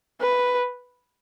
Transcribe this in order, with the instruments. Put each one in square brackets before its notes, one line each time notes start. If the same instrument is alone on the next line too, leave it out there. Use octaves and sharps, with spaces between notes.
[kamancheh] B4